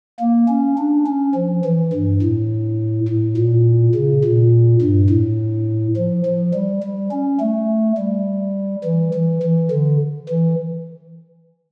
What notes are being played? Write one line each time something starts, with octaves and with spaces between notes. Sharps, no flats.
A#3
C#4
D4
C#4
F3
E3
G2
A2
A2
A#2
C#3
A#2
G2
A2
F3
F3
G3
G3
C#4
A3
G3
E3
E3
E3
D3
E3